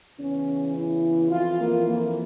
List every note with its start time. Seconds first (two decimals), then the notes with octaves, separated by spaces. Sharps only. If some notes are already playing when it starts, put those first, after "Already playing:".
0.18 E2 C#3 E3 C#4
0.76 E4
1.31 F2 E3 F4
1.59 A#3
1.88 A#3